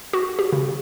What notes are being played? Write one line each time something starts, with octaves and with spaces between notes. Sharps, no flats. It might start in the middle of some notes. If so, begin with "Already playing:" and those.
F#4
G4
C#3